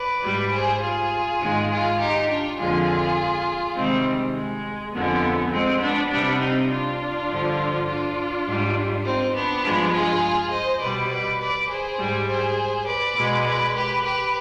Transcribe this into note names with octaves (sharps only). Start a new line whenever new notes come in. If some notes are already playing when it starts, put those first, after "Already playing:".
Already playing: B4 D5
G#2 G3
G#4 C5
F4 G#4
G#2 D#3 G#3
F4 G#4
D#4 G4
D4 F4
F2 D3 F3 G#3 F4 G#4
C3 D#3 G3 G#3 C4
G#3
F2 D3 G#3 B3
G#3 C4
B3 D4
C3 G3 B3 D4
C4 D#4
D4 F4
G2 D3 F3
D4 F4
G#2 G3
C4 D#4
B3 D4
G2 F3 G#3
F4 G#4
C5 D#5
B2 G3 B4 D5
B4 D5
B4 D5
G#4 C5
G#2 G3
G#4 C5
B4 D5
B2 G#3
B4 D5
G4 B4
G4 B4